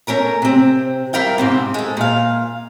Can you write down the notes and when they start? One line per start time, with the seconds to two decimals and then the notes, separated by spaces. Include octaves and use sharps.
0.07 A3 C#4 A#4 A#5
0.42 C3 C4
1.13 G3 E4 A#4 F5 G5
1.38 G#2 C3 C4
1.74 G#3 A4
1.97 A#2 F5